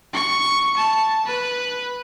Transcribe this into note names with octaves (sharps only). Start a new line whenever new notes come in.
C#6
A5
B4